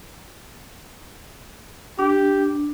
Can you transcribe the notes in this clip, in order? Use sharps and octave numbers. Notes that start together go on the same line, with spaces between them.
D4 G4